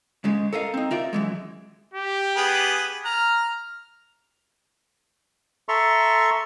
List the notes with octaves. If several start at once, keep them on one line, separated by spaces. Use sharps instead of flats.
G#2 C#3 G#3
A4 A#4 D#5 F5
C4 D#4
C3 D#4 F4 A#4 D5 E5
F#2 E3 G#3
G4
B3 G#4 B4
A#5 F6
A4 E5 A#5 C6 C#6